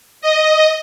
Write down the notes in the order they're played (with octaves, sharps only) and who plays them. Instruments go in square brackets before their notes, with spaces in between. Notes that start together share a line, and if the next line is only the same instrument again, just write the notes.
[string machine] D#5